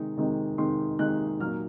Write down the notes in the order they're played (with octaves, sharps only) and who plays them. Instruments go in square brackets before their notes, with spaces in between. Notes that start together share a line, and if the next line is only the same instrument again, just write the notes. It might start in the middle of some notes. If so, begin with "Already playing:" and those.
Already playing: [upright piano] C3 D#3 G#3 D#4
C3 D#3 G#3 D#4
C3 D#3 G#3 D#4 C6
C3 D#3 G#3 D#4 F#6
A#2 F#3 A#3 D#4 F6